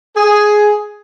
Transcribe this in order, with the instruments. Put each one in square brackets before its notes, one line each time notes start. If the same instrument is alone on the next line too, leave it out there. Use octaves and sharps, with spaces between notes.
[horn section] G#4